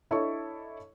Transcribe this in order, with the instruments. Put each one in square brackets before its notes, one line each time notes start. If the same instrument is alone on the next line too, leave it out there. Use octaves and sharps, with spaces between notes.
[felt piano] D4 E4 A4 C#5 D#5 C#6